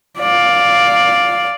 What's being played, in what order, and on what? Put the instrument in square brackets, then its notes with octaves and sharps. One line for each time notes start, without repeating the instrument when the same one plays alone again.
[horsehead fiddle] D5 F5